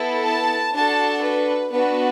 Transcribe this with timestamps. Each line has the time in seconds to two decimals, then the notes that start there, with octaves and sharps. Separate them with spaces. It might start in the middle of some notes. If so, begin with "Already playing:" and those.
Already playing: B3 E4 A4
0.26 A5
0.75 D4 F#4 A4 A5
1.23 B4
1.72 B3 D4 F#4 B4